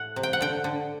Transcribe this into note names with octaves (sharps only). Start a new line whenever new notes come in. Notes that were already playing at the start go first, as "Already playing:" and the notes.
Already playing: A2 A3 F#5
C3
G5
F#5
D3 G5
D3